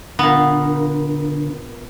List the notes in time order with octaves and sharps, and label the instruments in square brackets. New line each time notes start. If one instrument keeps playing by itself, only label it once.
[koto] A#2 B3 [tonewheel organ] D3